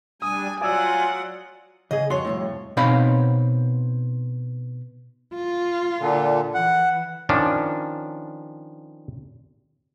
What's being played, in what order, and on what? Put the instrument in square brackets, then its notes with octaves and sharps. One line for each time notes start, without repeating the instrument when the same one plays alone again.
[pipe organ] G3 D4 [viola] G#5 [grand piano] D#6
[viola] F#3 F#5 [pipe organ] F4 [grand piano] D5 E6 [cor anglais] G#5
[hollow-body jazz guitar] C#3 G#4 [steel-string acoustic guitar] D#5
[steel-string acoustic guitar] F2 C#5 [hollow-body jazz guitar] F#4 C6
[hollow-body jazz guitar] C2 F#2 A2
B2 C4 D#4 C#5 F5 B5
[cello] F4
[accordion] A#2 D3
[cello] E3 [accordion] F#5
[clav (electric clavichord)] D#3 F3 C#4 D4